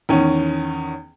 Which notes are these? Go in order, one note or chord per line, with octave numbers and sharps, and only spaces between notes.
E2 D#3 C#4